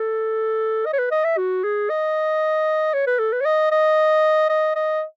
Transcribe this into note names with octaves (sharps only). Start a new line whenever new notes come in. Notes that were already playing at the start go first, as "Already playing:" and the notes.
Already playing: A4
D#5
C#5
B4
D#5
E5
F#4
G#4
D#5
C#5
B4
A4
B4
C#5
D#5
D#5
D#5
D#5